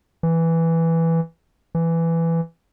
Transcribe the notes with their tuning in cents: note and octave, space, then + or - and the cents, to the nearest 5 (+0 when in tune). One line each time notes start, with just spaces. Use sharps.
E3 +0
E3 +10